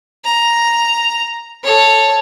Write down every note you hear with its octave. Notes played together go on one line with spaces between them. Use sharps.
A#5
A4 C#5